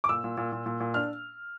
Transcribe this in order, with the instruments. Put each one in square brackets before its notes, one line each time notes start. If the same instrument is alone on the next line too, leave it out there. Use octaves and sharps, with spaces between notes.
[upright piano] D6
A#2 E6
A#2
A#2
A#2
A#2
A#2
D4 F6